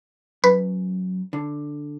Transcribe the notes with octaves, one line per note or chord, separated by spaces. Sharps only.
F#2 B4
D3